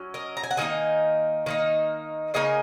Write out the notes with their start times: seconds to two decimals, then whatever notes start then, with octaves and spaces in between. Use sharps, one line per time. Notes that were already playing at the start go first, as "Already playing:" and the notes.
Already playing: F#3 C#4
0.14 A#4 D#5
0.37 A#5
0.44 G#5
0.51 F#5
0.57 D#3 A#3 D#4 D#5 G#5
1.46 D#3 A#3 D#4
2.34 C#3 A#3 D#4 D#5 G#5